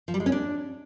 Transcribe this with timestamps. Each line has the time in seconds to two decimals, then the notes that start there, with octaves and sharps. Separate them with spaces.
0.08 F3
0.14 G3
0.20 G#3
0.26 C#4
0.32 D4